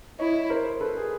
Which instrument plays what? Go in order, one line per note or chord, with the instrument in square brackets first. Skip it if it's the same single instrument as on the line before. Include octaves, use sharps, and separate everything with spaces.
[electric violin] E4 [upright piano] C#5 D#5
[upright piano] A#4 C5
A4 B4
G#4